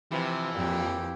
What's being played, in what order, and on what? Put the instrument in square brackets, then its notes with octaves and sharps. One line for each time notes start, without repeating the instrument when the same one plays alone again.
[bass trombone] C3 [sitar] E3 [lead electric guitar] F3
[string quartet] F2 G4 [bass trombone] A#2